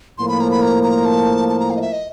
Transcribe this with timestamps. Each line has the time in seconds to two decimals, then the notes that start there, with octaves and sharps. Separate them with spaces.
0.18 A2 F3 A#3 C6
0.29 B5
0.40 A#5
0.51 B5
0.62 A#5
0.83 A#5
1.05 A5
1.49 A5
1.60 A#5
1.70 F5
1.76 D#5
1.81 E5
1.92 D#5